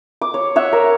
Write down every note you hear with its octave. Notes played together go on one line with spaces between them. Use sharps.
D6
C#5
C#5 E5 F#5
A#4